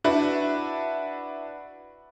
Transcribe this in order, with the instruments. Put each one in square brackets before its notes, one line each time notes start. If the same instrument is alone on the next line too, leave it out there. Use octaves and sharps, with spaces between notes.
[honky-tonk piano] D4 E4 F#4 B4